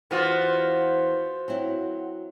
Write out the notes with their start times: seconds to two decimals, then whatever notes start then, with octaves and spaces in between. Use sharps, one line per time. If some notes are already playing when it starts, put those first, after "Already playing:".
0.11 E2 E3 B3 F4 F#4 C5
1.48 F#3 C4 E4